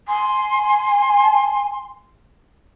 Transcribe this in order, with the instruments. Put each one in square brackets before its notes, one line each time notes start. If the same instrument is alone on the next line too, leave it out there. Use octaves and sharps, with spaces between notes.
[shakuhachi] G#5 [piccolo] C6